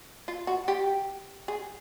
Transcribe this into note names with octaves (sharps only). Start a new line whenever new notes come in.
F4
F#4
G4
G#4